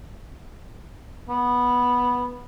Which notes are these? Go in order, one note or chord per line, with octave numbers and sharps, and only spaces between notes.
B3